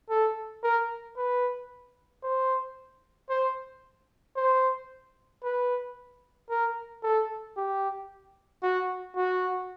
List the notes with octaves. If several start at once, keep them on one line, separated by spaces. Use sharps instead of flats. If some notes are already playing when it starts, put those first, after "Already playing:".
A4
A#4
B4
C5
C5
C5
B4
A#4
A4
G4
F#4
F#4